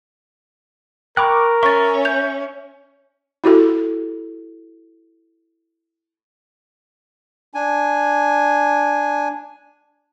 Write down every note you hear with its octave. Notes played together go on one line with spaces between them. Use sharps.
A#4 G5 B5 C#6 D6 F#6
C#4 E5 C#6 A6
G6 F7
E4 F#4 G4 A4
D4 G#5